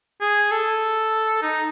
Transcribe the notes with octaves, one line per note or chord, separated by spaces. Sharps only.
G#4
A4
D#4